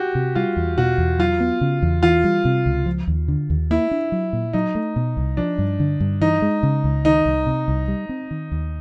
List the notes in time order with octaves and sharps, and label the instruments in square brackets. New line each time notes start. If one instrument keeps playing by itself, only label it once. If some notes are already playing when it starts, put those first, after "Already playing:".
Already playing: [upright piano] F#4 G4
[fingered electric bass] C3
[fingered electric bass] G3 [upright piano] F4
[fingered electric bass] E2
[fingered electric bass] B2 [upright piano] F#4
[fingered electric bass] E2
[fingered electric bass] F#3 [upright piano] F4
[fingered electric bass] B3
C#3
E2
[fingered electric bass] E3 [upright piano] F4
[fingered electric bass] G3
C3
C#2
F3
D#2
D3
D#2
[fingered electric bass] A#3 [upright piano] E4
[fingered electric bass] D4
F#3
A#2
[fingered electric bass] F#3 [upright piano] D#4
[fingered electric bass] A3
B2
C2
[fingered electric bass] F3 [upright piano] D4
[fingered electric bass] G2
D3
G2
[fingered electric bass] E3 [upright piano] D#4
[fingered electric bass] G#3
C#3
C#2
[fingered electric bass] D#3 [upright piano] D#4
[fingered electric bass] C2
C3
C2
G3
C4
D#3
D#2